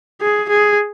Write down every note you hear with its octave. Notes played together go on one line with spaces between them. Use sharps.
G#4
G#4